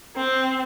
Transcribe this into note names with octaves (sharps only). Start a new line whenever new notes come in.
C4